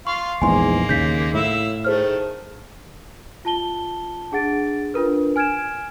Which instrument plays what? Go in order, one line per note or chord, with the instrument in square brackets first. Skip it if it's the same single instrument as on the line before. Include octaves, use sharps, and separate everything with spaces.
[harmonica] F4 F5 C6 [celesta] C#6
[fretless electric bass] A#1 E2 G#2 [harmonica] G#3 A#3 [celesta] G#5 C6
[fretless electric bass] D#2 C#3 [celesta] G6 B6
[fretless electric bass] A2 [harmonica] E4 F5 E6
[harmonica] D#3 A3 [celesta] G#4 C5 F6
[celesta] F4 A5 G7
D4 G#4 F#5 A6 D7
D4 F4 A#4 B4
G#5 F6 G#6 D7 E7